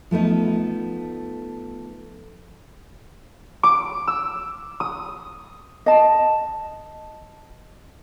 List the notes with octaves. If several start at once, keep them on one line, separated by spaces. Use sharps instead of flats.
F3 A3 B3 D#4
D6
E6
D#6
D#5 A5